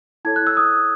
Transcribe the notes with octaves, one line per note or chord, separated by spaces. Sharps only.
E4 A4 C#5 G#6
F#6
E6
D#6